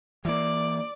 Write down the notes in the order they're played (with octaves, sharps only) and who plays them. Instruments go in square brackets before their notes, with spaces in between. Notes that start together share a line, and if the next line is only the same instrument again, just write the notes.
[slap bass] E3 A#3 [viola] D5